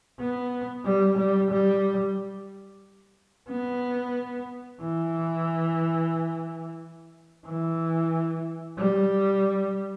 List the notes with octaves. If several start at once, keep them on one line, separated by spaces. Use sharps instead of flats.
B3
G3
G3
G3
B3
E3
E3
G3